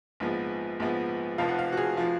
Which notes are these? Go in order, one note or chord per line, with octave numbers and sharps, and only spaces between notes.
A#1 G#2 F3 B3
A#1 G#2 F3 B3
F1 F2 F3 F5
F#5
F5
F#4
G#4
F3 F4